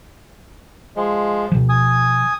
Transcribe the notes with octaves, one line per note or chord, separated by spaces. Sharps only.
F3 G#3
B2 F3
G#5 D#6